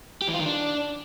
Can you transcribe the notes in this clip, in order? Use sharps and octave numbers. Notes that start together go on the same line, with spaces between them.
G4
E3
F4
D#3
D4